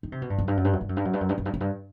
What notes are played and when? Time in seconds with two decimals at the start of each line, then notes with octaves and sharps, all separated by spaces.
0.03 D#3
0.12 C3
0.22 B2
0.30 G2
0.38 F#2
0.48 G2
0.57 F#2
0.65 G2
0.73 F#2
0.81 G2
0.89 F#2
0.97 G2
1.05 F#2
1.14 G2
1.21 F#2
1.29 G2
1.38 F#2
1.46 G2
1.54 F#2
1.61 G2